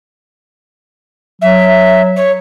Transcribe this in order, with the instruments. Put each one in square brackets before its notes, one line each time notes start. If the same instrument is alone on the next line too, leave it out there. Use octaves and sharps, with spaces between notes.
[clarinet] F#3 [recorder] E5
[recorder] C#5